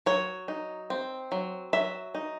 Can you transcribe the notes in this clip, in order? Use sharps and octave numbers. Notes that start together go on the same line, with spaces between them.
F#3 C#5
D#4
C4
F#3
F#3 E5
D#4